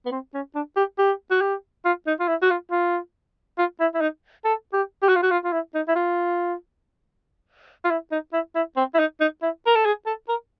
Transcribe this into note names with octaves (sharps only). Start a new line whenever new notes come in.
B3
C4
C#4
D4
G4
G4
F#4
G4
F4
D#4
F4
E4
F#4
F4
F4
F4
E4
E4
D#4
A4
G4
G4
F#4
F4
F#4
F4
F4
E4
D#4
E4
F4
F4
E4
D#4
E4
E4
C4
E4
D#4
D#4
E4
A#4
A4
G#4
A4
A#4